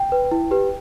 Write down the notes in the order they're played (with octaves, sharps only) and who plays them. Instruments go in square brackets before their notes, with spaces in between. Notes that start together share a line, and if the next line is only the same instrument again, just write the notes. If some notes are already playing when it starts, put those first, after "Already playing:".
Already playing: [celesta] G5
B4
E4
G4 B4